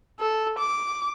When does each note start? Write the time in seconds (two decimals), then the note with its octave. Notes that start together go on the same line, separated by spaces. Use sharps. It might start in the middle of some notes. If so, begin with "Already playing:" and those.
0.20 A4
0.58 D6